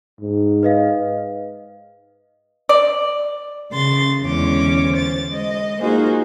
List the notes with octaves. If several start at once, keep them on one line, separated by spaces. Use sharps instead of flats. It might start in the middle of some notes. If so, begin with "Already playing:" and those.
G#2
B4 D#5 F5
D5
C#3 C6 A6
E2 D3 G#3 C#4 C#5 D6
C5 A6
G#3 D#5
A#3 D#4 F4 F#4 G#4 C5